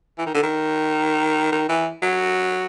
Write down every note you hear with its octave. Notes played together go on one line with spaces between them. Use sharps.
E3
D#3
D3
D#3
D#3
E3
F#3